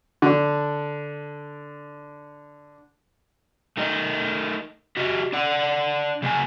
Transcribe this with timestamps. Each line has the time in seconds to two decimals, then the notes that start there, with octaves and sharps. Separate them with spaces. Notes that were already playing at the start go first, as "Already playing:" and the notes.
0.22 D3 D4
3.77 A3 D#4 A#4 D#5
4.97 F#4 G4 D#5
5.33 D4 D5 F#5
6.22 C#3 A#3 D#5 G#5